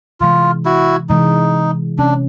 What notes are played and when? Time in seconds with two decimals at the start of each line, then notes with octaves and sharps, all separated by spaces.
0.20 C3 E3 G#3 F4
0.65 E4 F#4
1.09 C3 E3 G#3 D#4
1.98 C3 E3 G#3 C#4 D4